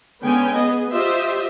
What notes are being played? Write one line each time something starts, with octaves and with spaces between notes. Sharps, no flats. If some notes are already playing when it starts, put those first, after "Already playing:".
D3 G#3 B3 C#4 G5 G#5
B3 G#4 D#5
F4 G4 C5 D#5 E5